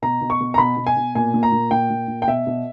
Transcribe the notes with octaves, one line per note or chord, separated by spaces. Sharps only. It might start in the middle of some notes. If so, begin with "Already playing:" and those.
B2 A#5
B2
C#6
B2
A#5
B2 B5
B2
G#5
B2
A#2 G#5
A#2
A#5
A#2
A#2 G5
A#2
A#2
G5
B2 E5
B2